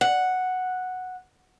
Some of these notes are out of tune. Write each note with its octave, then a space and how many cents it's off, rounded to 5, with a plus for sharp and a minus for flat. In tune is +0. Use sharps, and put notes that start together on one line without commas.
F#5 -5